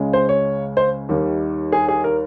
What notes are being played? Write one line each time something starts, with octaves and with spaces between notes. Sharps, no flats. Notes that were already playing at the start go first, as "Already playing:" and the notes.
Already playing: C#2 C#3 G#3
C5
C#5
C5
D#2 D#3 G3
G#4
G#4
A#4